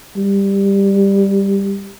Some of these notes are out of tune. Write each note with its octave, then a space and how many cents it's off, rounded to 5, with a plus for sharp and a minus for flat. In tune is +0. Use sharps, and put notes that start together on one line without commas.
G3 +10